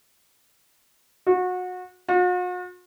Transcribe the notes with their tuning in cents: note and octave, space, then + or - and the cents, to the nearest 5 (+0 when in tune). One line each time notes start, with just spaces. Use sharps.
F#4 -25
F#4 -45